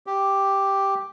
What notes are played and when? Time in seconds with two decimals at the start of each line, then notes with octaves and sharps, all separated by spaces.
0.06 G4